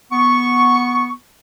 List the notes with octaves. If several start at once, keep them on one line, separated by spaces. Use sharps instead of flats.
B3 C#6